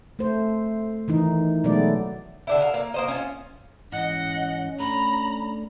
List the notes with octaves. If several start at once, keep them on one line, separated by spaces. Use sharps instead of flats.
A3 C5
D#3 E3 D#4
B2 F#3 G#3 A3 B3 D5
D3 D4 E4
F5
A#3
A#3 C5 D#5
C#4 F4
G#2 E3 C#4 D#5 F#5
A3 D4 A#5 B5